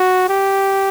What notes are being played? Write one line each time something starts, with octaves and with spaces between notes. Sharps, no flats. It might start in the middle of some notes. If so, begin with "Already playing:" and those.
Already playing: F#4
G4